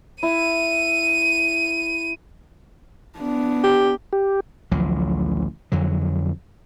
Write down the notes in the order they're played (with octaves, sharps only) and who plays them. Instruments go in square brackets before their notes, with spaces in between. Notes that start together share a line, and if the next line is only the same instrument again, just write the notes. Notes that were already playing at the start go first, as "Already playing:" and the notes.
[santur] E4 [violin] D#7
[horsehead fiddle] B3 D4
[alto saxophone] G4
[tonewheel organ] G4
[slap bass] A1 D2 F3 F#3
F2 D3 F#3